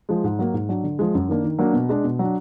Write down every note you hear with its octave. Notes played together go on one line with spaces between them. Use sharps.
F3 G#3
G#2
F#3 A#3
G#2
F#3 D4
D3
F3 G#3
F#2
D#3 A#3 D4
D#3
F#3 A#3 D4
B2
G#3 D4
B2
F#3 D4